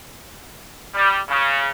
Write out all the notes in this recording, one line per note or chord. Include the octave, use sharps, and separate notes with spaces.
G3
C#3